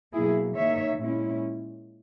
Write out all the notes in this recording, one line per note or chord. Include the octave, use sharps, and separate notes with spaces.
B2 F#3 A#3 E4 G#4
D#3 A#3 D#4 C#5 E5
A#2 G#3 C#4 E4